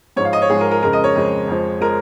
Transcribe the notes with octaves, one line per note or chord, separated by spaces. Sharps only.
G#2 F3 G#3 C#5
F5
D#5
C#5
G#2 F3 G#3 G#4
A#4
A#4
F2 C#3 G#3 A#4
D#5
C#5
F2 C#3 G#3
F2 F3 G#3
F3 G#3 A#4